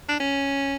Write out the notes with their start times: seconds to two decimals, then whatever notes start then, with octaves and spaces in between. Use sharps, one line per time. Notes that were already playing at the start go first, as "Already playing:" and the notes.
0.09 D4
0.20 C#4